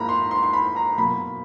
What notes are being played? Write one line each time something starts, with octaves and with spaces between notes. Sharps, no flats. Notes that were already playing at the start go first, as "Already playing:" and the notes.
Already playing: G#2 F3 A#3 A#5 B5
C6
C6
C6
B5
A#5
B2 F#3 A#3 B5